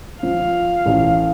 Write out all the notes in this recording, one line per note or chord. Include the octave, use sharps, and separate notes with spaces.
F3 F5
A1